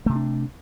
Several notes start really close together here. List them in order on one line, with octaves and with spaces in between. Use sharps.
A3 C3 B3 D4